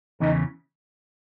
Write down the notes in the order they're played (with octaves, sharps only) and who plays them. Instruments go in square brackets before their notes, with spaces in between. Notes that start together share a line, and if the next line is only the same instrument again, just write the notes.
[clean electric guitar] E2 C#3 E3 [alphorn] D#4